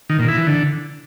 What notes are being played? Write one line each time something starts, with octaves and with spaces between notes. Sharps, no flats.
D#3
A#2
E4
E3
D3